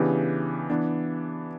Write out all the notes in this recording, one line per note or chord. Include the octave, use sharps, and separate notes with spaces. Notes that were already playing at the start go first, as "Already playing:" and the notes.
Already playing: C#3 E3 B3 D4 G4
E3 B3 D4